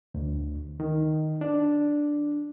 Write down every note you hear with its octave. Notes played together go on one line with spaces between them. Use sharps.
D2
D#3
D4